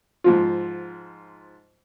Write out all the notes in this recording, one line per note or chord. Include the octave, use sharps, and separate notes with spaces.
G#2 F3 F4